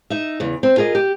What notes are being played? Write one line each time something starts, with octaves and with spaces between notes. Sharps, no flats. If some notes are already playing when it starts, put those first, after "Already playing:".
D#4 E5
E2 C#3
C4
F4 G#4 A#4 D#5
G4